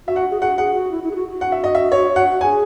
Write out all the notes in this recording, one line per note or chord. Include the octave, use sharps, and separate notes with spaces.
F#4 E5
F#5
G#4
F#4 F#5
G#4 F#5
F#4
E4
E4
G#4
F#4
F#4
F#5
E5
D#5
E5
C#5
F#5
G#4 G#5